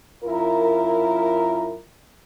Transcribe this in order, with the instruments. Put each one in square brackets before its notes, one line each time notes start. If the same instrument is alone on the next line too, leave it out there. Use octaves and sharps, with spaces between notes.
[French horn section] F#2 E4 F4 A#4